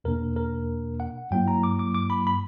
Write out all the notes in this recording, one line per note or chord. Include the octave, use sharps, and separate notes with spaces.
E2 B2 A#3 D4 A#4
A#4
F#5
G2 F#3 A#3 E4 G5
A#5
D6
D6
D6
B5
B5